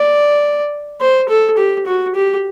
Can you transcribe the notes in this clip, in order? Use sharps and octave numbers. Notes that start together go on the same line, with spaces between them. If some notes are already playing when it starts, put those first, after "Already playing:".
Already playing: D5
C5
A4
G4
F#4
G4